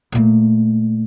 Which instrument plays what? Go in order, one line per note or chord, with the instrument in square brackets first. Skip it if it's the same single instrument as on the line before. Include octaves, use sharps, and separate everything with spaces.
[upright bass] A#2 A3